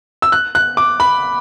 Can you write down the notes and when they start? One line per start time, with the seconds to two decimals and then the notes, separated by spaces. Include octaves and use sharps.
0.22 E6
0.32 F#6
0.55 F#6
0.77 D6
1.00 B5